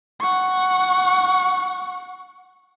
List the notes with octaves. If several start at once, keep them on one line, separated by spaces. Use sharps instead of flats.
F#5 C#6